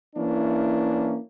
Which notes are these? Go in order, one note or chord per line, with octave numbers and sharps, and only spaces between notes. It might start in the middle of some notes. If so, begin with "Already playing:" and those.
E3 A#3 C#4 D4 E4